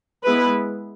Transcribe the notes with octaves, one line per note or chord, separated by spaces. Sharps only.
G#3 B3 E4 B4